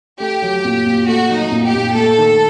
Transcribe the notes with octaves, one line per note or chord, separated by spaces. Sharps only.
A3 G4
F#3
A#2
A#2
A3 F#4
F#3
D#4
A#2
G4
A#2
A3 A4
D#3